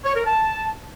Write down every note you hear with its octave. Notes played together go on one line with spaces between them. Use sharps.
C#5
A#4
A5